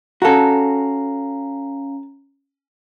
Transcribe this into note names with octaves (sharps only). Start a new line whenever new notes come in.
C#4 F#4 A4 F5 A#5